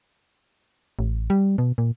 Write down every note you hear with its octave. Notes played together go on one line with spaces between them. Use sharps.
A1
G3
B2
A#2